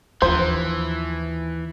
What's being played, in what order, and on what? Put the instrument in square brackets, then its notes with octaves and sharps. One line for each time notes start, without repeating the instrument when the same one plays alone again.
[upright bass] D#2 D4 [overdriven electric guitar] E3 [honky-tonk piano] F3 [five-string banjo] C5